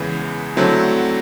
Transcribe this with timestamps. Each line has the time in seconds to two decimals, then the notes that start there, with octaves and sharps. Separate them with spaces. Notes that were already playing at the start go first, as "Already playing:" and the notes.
Already playing: E2 C#3 E3 G#3 B3
0.57 D3 F#3 A3 C4 E4